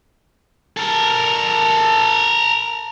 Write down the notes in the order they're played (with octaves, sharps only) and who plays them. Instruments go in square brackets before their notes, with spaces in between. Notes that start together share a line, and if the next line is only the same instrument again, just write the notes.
[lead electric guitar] A4 A#4